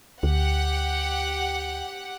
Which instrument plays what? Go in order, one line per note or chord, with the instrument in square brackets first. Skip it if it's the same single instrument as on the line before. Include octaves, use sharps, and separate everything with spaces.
[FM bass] D2 [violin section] G4 F#5